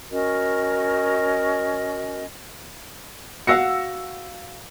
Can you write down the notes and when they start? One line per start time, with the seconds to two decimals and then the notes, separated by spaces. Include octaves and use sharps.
0.10 C#4 F#4 A#4 D#5
3.47 F#4 F5 F#5 E6 A#6 C#7